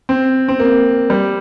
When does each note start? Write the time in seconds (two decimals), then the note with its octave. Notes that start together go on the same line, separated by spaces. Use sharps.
0.09 C4
0.48 C4
0.60 A#3
1.10 G3